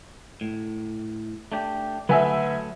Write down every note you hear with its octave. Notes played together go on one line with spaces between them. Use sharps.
A2
A3 D4 G4
D2 F#3 A3 B4 E5 G#5